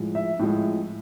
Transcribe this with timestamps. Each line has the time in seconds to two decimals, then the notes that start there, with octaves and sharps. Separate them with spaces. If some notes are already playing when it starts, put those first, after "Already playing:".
Already playing: A2 F3 G#3
0.15 E5
0.39 A2 F3 G#3